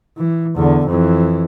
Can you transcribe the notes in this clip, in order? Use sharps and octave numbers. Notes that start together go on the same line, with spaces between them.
E3
E2 D3
F2 E3